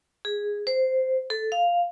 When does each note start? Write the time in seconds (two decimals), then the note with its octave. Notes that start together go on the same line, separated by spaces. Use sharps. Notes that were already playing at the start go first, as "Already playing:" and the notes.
0.25 G#4
0.67 C5
1.30 A4
1.52 F5